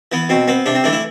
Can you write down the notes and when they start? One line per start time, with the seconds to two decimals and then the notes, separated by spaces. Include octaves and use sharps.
0.12 E3 B3
0.29 B2 C4
0.48 B3 C4
0.66 C3 D4
0.75 C4
0.84 E3 A3 D4
0.93 E4